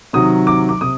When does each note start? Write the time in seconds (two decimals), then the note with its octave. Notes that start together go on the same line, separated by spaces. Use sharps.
0.13 C3 D#3 F#3 D#6
0.47 D6
0.69 D6
0.81 C3 D#6